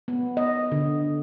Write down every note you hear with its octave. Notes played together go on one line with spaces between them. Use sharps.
B3
D#5
D3